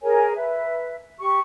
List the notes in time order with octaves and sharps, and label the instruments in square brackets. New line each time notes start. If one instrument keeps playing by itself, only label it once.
[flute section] G#4 A#4 C#5 G#5
B4 E5
G4 C#6